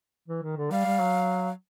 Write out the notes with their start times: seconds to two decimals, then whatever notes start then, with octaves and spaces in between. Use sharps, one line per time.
0.28 E3
0.42 D#3
0.57 D3
0.71 G3 F5
0.86 G3
1.00 F#3